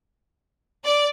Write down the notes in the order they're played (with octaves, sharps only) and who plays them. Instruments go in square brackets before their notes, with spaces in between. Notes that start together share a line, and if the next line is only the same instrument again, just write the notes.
[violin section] D5